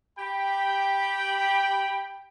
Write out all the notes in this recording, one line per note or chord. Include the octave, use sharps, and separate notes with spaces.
G4 G5 B5